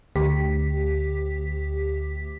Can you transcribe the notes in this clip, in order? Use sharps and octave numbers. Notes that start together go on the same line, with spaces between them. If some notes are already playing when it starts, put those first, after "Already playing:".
D2 G4 B6